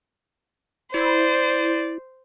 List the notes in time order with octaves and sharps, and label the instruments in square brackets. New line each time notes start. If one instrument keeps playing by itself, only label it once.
[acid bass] E4 [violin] C5 [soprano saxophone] D5